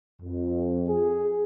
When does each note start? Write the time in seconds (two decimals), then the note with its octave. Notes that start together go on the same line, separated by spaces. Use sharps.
0.22 F2
0.88 G#4